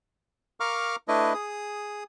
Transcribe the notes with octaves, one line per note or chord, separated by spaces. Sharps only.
A#4 F5 A#5 C#6 D6 F6
A3 D4 E4 B4 D#5
G#4 D#6